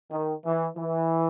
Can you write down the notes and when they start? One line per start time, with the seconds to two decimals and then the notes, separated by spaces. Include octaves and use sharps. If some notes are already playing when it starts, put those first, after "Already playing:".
0.11 D#3
0.44 E3
0.77 E3